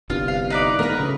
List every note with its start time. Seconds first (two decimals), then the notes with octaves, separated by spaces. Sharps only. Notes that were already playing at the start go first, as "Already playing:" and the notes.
0.10 G1 C2 G2 F4
0.28 F5
0.50 D#4 B4 D5
0.79 D#3 A3 B3 A#4 B4
0.98 D2 C#3